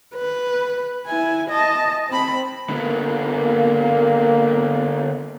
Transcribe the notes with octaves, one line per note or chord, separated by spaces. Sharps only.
B4
E4 G#5
D#5 A5
C4 B5
D3 A#3 B3